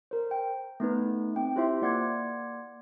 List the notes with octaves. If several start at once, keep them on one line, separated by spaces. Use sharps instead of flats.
A#4 C5
G5
A3 B3 D#4 B4
C4 G5
E4 F4 G4 C5 E5 C6
A#3 D5 F#5 C6 D6 G#6